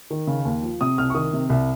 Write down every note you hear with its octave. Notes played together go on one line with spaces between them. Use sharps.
D#3
C#3
D#2
F3
C3 D#6
C2 F6
C#6
D#3 D#6
C3
C2